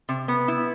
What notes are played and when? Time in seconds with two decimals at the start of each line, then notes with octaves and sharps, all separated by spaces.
0.09 C3
0.28 B3
0.48 E4